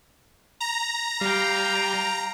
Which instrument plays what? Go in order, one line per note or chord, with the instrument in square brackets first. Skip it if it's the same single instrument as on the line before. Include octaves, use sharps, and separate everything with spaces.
[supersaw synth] A#5
[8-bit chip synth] G3 [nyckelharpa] F5 G5